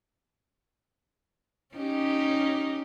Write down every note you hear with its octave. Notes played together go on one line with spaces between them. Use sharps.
C#4 D#4 G4